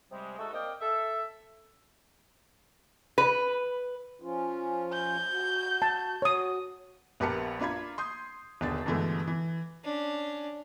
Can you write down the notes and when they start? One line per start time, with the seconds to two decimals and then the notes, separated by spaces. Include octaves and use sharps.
0.11 C3 G3 G#3
0.39 G#3 A3 D#4 F#4 A4
0.53 A#3 C4 D5 D#5 F5 G5
0.81 A4 E5
3.18 B4
4.22 F3 C#4 F4
4.93 G6
5.31 F#4
5.82 A5
6.22 F#4 C#5 D#6
7.20 A#1 B3 G4 A#4 A5 C#7
7.59 A#3 D4 F4 B5 G#6
7.98 C6 D#6 G6
8.61 D#1 B2 D3 D4 G#4 A6
8.86 G2 B2 D3 E3 G#3 A3
9.27 E3
9.84 C#4 D4